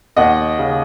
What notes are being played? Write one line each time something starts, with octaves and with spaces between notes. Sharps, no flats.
D#2 D#5 F#5
C#3